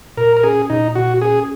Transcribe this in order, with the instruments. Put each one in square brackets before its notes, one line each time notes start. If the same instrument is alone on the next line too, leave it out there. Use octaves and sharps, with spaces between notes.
[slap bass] A#2 [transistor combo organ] A#4
[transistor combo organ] A#4
[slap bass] C#4 [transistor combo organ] G#4
[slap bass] A#2 [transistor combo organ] D#4
[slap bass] A#2 [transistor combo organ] F#4
[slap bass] C#4 [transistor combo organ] G#4